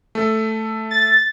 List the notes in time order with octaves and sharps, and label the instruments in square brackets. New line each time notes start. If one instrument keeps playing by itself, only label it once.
[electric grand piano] A3 A4
[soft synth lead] A6